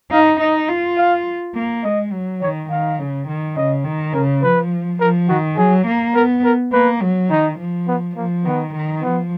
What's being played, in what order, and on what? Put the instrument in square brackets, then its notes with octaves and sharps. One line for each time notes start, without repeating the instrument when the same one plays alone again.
[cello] D#4 [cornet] F5
[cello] D#4 [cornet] D#5
[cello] F4
[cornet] F5
[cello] A#3
[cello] G#3 [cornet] D#5
[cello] F#3
[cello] D#3 [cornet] C#5
[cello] D#3 [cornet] F5
[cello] C#3
D#3
[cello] C#3 [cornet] D#5
[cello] D#3
[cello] C#3 [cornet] A#4
[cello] F3 [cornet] B4
[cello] F3 [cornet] A#4
[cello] D#3 [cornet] F#4
[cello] F#3 [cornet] G#4
[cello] A#3
[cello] B3 [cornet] A#4
[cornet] A#4
[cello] A#3 [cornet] B4
[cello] F#3
[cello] D#3 [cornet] D#4
[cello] F3
[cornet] B3
[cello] F3 [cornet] A#3
[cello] D#3 [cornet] B3
[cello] D#3
[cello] F3 [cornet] B3